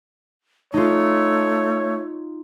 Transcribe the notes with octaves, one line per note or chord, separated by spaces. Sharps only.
A3 D#4 F4 C#5